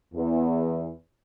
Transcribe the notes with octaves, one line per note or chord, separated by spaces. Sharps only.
E2